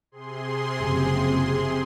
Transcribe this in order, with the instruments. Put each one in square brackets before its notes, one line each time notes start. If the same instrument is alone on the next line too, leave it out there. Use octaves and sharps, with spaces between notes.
[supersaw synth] C3 G#4 C6
[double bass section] F#1 F3 C4